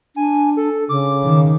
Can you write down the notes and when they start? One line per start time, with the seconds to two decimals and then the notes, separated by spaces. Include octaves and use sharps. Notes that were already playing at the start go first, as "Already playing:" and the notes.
0.16 D4 G#5
0.57 A4
0.89 C#3 D6
1.24 D#3